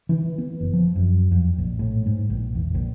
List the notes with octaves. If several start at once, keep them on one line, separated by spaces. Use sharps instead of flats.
E3
B3
F#1
F3
F#2
F2
A#1
A2
G#2
A#1
E2
A#1